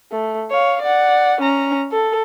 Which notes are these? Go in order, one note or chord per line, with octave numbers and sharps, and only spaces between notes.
A3
C#5 F5
D5 F#5
C#4 A#5
A4